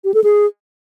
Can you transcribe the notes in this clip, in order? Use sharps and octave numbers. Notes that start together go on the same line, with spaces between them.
G4
A4
G#4